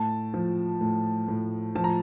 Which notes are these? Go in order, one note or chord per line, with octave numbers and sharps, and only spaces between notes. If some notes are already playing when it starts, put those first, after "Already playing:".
Already playing: A2 A5
F3
A2
A2
F3 A5
A#5